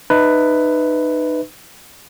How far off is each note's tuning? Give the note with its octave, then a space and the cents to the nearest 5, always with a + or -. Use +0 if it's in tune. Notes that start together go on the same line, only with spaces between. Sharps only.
D#4 -30 B4 +10 E5 -25